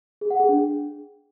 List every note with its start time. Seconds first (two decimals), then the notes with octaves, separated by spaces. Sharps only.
0.21 G#4
0.31 F#5
0.40 G#4
0.49 D4